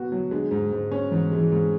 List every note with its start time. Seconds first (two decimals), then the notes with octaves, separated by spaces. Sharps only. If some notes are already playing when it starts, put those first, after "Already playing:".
Already playing: B2 F#3 B3 F#4
0.12 F#3
0.31 D3 G#3
0.51 G#2
0.72 G#2
0.92 C#4
1.12 G#2 E3
1.32 G#3
1.39 E3
1.52 G#2